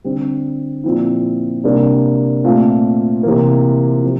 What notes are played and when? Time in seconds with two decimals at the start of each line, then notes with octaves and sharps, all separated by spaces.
0.04 D3 G3 C4
0.84 A#2 F3 C4 E4
1.64 C3 G3 A#3 D4
2.44 A#2 A3 C4 F4
3.23 C3 E3 A#3
4.03 F3 C4